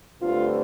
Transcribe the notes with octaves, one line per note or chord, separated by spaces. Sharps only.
G2 D3 A3 C4 F4